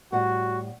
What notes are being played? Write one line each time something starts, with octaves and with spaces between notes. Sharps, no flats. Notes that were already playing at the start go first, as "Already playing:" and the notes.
A2 G3 F#4 F#5